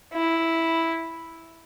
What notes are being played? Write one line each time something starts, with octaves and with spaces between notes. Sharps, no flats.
E4